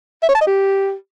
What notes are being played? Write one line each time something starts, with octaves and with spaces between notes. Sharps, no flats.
E5
C#5
A5
D#5
G4